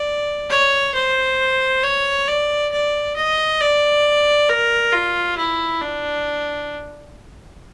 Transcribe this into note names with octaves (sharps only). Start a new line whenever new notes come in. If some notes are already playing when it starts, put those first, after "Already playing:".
Already playing: D5
C#5
C5
C#5
D5
D5
D#5
D5
A#4
F4
E4
D4